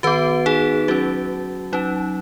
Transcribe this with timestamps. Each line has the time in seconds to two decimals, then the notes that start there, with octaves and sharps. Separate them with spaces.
0.03 D#3 B3 F#4 B4
0.46 D#4 G#4
0.88 F#3 C#4 F#4
1.73 F#3 C#4 D#4